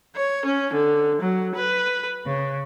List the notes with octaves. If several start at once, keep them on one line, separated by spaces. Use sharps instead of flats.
C#5
C#4
D3
F#3
B4
C#3